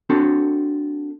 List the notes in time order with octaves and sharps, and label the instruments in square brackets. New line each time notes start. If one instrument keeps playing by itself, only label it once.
[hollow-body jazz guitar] C4 D4 F#4 A4